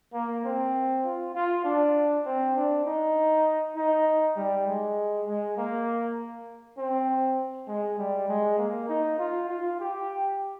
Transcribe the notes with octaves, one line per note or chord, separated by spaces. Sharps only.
A#3
C4
F4
F4
D4
C4
D4
D#4
D#4
G3
G#3
G#3
A#3
C4
G#3
G3
G#3
A#3
D#4
F4
F4
G4